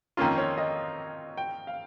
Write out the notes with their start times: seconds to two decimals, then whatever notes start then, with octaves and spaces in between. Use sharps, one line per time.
0.17 F2 D#3 A#3 C#4 F4 C6
0.38 C#5
0.58 D#5
1.37 G5
1.67 F5